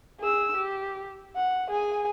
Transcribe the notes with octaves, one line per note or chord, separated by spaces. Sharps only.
G#4 E6
G4
F#5
G#4 G#5